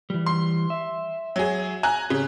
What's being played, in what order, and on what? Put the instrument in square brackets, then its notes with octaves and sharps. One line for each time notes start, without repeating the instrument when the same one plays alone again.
[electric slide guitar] E3 G3
[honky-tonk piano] C6
[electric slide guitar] E5
[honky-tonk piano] F#3 G#4
G#5 A#5 F#6
[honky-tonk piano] C#3 [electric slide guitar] G4 C#5